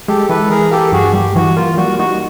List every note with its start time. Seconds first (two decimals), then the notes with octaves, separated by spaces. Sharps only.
0.08 G#3 G4 A4
0.29 E3 A4 B4
0.50 E3 G#4 A#4
0.71 A#3 G4 A4
0.92 G2 F#4 G#4
1.13 G3 G4
1.36 E3 F#4
1.56 A#3 F4
1.77 G3 F#4
1.99 D#4 F#4